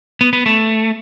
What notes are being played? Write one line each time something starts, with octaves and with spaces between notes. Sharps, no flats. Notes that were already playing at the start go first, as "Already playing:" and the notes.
B3
B3
A3